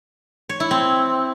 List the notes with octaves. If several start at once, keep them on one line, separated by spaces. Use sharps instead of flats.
C#5
E4
C4